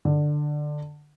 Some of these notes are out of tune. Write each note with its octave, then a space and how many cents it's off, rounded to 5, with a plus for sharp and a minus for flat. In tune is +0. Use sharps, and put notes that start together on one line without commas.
D3 +15